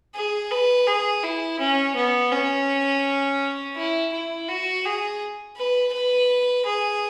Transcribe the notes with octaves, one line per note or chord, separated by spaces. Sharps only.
G#4
B4
G#4
E4
C#4
B3
C#4
E4
E4
F#4
G#4
B4
B4
G#4